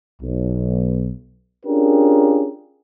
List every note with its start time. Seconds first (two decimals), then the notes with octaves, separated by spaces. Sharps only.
0.22 B1
1.66 C#4 D4 F4 G4 G#4 A#4